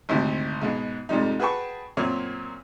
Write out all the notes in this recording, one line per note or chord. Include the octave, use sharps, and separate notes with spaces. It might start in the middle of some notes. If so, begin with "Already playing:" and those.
G#1 D2 C3 E4 C5
G#2 B2 G#3
F2 G#2 C3 G3 D#4
F#4 G#4 B4 G5 A5 C#6
F#2 A#2 C4 C#5